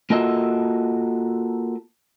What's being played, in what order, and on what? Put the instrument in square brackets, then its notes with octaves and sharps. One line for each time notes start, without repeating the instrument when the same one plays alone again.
[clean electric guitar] A#3 F4 F#4 A4 D#5 E5